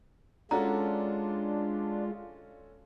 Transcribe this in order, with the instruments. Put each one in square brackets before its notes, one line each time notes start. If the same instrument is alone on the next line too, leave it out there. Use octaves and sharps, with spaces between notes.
[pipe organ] G#3 F4 [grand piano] C#4 F#4 A4 [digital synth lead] D4 [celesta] A#5